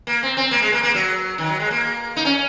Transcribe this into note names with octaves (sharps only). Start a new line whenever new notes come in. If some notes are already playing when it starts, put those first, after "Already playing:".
A#3
C4
C4
A#3
G#3
A#3
A#3
F#3
D#3
F#3
G#3
A#3
D#4
C#4